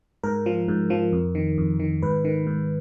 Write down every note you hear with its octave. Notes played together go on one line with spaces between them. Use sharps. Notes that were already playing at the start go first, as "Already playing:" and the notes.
G#2 A#4
F3
G#2
F3
F2
D#3
F2
D#3
G#2 B4
D#3
G#2